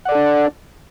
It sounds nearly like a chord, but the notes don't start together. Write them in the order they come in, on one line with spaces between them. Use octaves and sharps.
F#5 D5 A4 D4